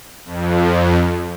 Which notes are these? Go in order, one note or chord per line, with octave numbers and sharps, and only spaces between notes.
F2